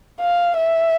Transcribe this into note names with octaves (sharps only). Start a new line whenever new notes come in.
F5
E5